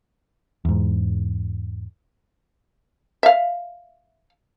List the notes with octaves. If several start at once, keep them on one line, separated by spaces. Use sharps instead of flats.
E2 G#2
E5 F5